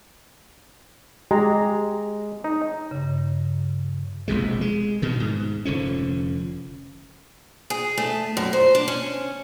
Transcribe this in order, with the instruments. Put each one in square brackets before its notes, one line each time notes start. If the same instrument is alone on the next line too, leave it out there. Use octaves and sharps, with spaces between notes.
[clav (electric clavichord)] G#3 [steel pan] G4 A#5
[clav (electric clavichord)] D#4
[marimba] G2 C#3
[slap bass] E1 A#1 C3 G#3
G#3
G2 B2 D#3
G#2
F1 D3 F3 C#4
[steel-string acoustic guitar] G#4
A3
F#2
C5
D4
C#4